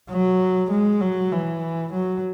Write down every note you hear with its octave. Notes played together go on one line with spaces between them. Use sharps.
F#3
G#3
F#3
E3
F#3